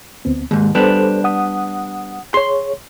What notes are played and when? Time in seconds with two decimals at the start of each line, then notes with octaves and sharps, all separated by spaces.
0.25 D2 B3 C4
0.51 D#2 G#2 G#3
0.75 G3 B3 D4 A4 C5
1.24 F#5 D#6
2.34 G#4 C#5 C6